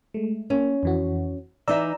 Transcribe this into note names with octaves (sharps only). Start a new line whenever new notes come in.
G#3 A3
A#3 C#4
F2 E3 F#4
E3 D#4 D5 E5 A#5 E6